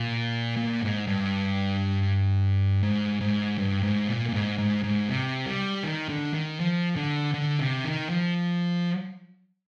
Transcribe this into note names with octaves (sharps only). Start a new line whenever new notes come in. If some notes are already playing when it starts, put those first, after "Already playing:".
Already playing: A#2
A#2
G#2
G2
G#2
G#2
G2
G#2
A#2
A#2
G#2
G#2
G#2
C3
G3
D#3
D3
D#3
F3
D3
D3
C3
D#3
F3